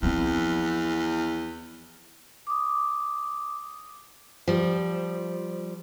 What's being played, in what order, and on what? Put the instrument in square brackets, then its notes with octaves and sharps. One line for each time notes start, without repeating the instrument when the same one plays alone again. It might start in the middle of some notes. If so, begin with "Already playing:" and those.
[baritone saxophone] E2 [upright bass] F3 C4
[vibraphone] D6 D#6
[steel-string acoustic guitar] F3 G3